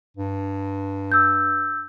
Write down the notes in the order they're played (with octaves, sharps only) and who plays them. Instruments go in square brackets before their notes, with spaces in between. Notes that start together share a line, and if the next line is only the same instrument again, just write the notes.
[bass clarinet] G2
[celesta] E6 G6